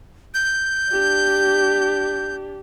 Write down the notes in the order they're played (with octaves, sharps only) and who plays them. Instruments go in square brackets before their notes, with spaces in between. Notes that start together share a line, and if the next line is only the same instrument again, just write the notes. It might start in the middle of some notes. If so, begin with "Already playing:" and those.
[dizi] G6
[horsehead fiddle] D4 G4